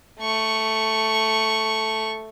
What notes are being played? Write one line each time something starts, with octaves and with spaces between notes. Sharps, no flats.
A3 C#6